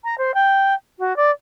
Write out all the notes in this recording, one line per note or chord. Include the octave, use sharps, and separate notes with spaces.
A#5
C5
G5
F#4
D5